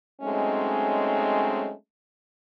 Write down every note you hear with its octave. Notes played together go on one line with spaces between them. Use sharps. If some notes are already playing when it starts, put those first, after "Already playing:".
F#3 G#3 A3 C4 C#4 D#4